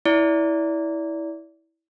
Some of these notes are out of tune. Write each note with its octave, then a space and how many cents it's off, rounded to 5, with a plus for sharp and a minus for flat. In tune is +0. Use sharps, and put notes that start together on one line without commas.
E4 -15 D5 -30